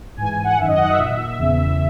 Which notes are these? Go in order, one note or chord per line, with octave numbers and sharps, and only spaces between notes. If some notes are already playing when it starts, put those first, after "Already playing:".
G#2 E3 G#5
F#5
F#2 D#3 E5
D#5
F#5
E5
A#2
E2 C#3 E3